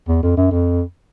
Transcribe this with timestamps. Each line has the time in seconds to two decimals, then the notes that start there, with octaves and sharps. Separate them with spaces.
0.08 E2
0.23 F2
0.37 F#2
0.51 F2